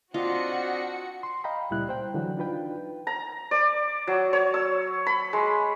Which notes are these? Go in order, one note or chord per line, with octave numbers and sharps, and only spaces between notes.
C4 D4 F4 F#4 D#5 C#7
C6
D#5 F5 G5 A#5 B5
C#2 A#2 G3 E4 F#6
C5 G5
D3 E3 F#3
D4 D#4 F4 B4 G5
A#5
D5
F#3
C#5
E6
B5
G#3